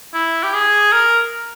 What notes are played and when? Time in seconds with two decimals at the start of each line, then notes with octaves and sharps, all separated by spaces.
0.14 E4
0.43 G4
0.54 G#4
0.92 A#4